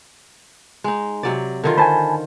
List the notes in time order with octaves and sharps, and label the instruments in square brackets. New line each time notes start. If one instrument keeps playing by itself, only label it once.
[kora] G#3 D#4
C3 F#3 D5
D3 D#3 F4
[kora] C5 [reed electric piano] G#5 A5 B5